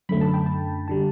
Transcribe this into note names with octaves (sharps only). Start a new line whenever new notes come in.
F#2 D3 A3 B5
A5
G5
A5
D3 G3 A5